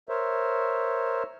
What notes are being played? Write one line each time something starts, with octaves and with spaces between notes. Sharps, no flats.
A#4 C5 C#5 E5